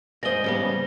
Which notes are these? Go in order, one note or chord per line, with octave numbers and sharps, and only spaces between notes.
G#2 C5 D5 D#5 A#6 G7
C#3 G3 B3